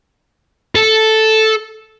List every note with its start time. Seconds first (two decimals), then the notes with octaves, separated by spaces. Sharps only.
0.75 A4